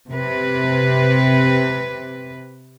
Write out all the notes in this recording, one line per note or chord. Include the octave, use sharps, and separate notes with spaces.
C3 B4